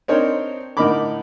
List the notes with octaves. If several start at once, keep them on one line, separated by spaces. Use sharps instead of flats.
C4 D4 D#4 A#4 C5 C#5
A2 D3 D#4 A#4 B5 D6